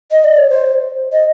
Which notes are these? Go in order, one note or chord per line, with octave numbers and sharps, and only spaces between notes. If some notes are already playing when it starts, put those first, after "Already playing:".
D#5
D5
C#5
C5
D#5